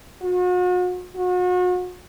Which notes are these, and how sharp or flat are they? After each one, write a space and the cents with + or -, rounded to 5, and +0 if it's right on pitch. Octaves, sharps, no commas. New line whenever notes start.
F#4 -40
F#4 -40